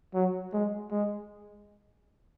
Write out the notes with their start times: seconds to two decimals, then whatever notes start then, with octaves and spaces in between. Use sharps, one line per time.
0.14 F#3
0.53 G#3
0.91 G#3